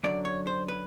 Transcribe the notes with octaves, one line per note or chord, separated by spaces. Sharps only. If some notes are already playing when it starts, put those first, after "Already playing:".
F#2 D3 F#3 D5
C#5
C5
B4